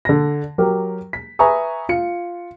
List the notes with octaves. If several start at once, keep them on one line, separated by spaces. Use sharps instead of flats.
D3 A#6
F#3 G4 A#4
B6
B4 E5 G#5 A#5 C#6 D#6
F4 C#7